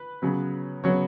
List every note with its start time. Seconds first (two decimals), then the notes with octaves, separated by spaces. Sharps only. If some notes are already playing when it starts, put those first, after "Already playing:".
Already playing: B4
0.22 C#3 F#3 B3
0.84 C#3 F#3 B3 C#5